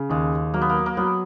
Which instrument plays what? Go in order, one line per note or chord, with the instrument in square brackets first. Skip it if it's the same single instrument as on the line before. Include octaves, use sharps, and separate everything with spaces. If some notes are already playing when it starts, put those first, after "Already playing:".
Already playing: [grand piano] C#3
[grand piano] D#2 [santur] G#3
[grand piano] F#3 [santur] A#3
[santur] B3
A#3
A#3
[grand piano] F#3 [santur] B3